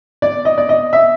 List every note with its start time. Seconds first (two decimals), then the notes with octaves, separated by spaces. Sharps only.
0.22 D5
0.45 D#5
0.58 D5
0.69 D#5
0.93 E5